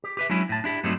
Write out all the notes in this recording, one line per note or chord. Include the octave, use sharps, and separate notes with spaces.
G4
G4 B4 E5
F#3 G#3 C#4 D4 E4
A2 A5
D4 E4 G4
G2 F#3 G3 A3 C4 D#4